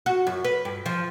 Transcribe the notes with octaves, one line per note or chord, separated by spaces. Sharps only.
F#4
F#2
B4
G2
F3